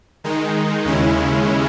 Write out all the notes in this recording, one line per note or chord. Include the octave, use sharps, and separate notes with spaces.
D#3 G#3 D#4
D#2 C#3 G#3 C#4 E4